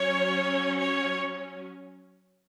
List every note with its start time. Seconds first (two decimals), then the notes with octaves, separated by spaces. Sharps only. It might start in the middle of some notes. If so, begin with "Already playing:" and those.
Already playing: F#3 C#4 C#5
0.80 C#5